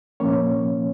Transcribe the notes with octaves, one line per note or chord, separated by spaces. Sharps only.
A#2 F3 A#3 C#4 C#5